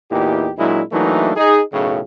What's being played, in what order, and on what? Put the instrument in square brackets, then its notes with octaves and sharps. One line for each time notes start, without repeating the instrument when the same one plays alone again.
[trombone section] E2 A#2 D#4 E4 G4
A#2 F#3 G#3 D4 E4
E3 F#3 A3 A#3 D4 D#4
D#4 G#4
B1 F#2 A2 C#3